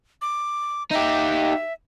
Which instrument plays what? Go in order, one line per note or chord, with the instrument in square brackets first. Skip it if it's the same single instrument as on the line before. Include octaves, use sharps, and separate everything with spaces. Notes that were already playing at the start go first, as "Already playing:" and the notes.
[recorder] D6
[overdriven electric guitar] D#4 G4 [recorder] E5